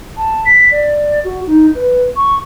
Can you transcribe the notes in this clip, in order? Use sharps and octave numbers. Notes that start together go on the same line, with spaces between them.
A5
B6
D5
F#4
D#4
B4
C#6